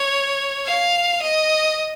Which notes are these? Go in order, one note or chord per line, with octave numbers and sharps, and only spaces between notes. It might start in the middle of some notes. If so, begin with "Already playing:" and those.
Already playing: C#5
F5
D#5